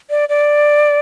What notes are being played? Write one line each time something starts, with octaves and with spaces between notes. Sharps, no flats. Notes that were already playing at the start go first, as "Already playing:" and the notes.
D5
D5